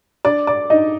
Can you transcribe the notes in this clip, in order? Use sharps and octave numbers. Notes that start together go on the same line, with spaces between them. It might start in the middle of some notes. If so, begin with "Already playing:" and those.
D4 D5 D6
D5 D6
D4 D#4 D#5